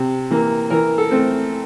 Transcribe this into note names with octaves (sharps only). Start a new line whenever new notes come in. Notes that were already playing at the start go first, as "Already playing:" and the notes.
Already playing: C3
E3 A#3
E3 A#4
A4
A3 C4